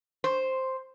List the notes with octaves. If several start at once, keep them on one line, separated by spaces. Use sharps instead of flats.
C5